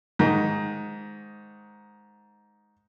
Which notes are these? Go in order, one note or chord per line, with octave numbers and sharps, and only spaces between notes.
G#2 D#3